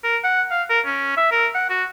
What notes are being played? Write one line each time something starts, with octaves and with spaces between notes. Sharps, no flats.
A#4
F#5
F5
A#4
C#4
E5
A#4
F#5
F#4